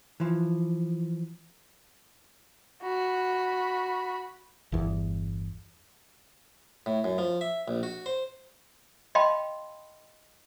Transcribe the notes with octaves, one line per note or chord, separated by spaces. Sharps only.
E3 F3
F#4 B5
G1 E2
A2
F#2
F3
E5
A#1
F#4
C5
D#5 F5 G5 A5 B5 C6